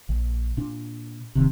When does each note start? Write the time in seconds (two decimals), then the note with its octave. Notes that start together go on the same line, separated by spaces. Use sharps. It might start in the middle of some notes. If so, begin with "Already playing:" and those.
0.09 A#1
0.57 A#2 D4
1.35 D1 D#2 C3